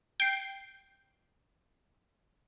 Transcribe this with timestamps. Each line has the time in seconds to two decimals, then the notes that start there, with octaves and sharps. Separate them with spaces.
0.20 G5 C7